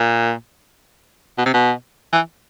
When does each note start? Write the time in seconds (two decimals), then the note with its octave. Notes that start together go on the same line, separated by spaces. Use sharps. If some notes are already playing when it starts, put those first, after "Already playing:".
Already playing: A#2
1.38 B2
1.46 C3
1.54 B2
2.13 E3